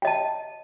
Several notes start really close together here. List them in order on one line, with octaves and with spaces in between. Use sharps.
G5 D#5 A5